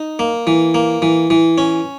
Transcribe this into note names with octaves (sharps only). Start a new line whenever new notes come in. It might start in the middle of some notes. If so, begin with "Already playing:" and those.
Already playing: D#4
A#3
E3
A#3
E3
E3
C#4